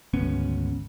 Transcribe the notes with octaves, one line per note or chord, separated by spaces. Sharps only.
G#1 D2 B3 C#4